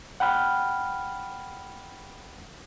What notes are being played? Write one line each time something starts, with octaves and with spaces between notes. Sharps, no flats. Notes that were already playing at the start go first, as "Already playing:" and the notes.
F#5 G5 B5 F6